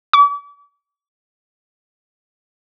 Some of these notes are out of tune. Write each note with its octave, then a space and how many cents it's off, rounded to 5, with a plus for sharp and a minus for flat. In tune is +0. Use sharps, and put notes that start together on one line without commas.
D6 -40